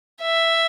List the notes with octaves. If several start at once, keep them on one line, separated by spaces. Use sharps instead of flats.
E5